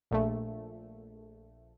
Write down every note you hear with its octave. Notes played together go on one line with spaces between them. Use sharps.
A#1 A3